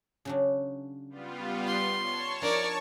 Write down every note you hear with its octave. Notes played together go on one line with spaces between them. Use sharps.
C#3 F#3 D4
G3 B3 F4
C6
C#5 A5 C#6
F3 D4 D#4 A#4 D5